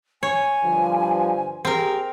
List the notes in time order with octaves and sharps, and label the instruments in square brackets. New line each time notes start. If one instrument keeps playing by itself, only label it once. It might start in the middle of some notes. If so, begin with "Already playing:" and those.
[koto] C#5 [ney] G#5
[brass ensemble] G2 D3 F3
[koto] C4 A#4 [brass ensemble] G4 G#4